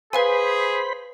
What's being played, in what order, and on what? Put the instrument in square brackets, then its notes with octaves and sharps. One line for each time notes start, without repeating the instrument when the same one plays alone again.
[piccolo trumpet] G#4 [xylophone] B4 F5 G#5 [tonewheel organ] C5 B5